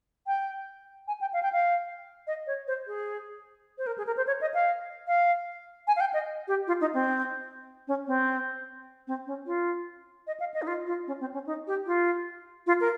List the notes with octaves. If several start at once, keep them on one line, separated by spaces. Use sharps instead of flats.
G5
G#5
G5
F5
G5
F5
D#5
C#5
C5
G#4
C5
A#4
G#4
A#4
C5
C#5
D#5
F5
F5
G#5
F5
G5
D#5
G4
F4
D#4
C4
C#4
C4
C4
C#4
F4
D#5
F5
D#5
D#4
F4
F4
C#4
C4
C#4
D#4
G4
F4
F4
A#4